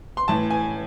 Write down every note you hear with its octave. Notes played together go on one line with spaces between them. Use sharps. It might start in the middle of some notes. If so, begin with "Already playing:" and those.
C6
A2 E3 A5
G#5